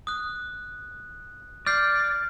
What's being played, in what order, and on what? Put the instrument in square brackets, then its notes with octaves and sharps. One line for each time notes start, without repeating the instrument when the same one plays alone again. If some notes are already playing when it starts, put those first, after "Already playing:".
[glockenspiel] D#6 F#6
[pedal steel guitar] D5 [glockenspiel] F6 G6 C7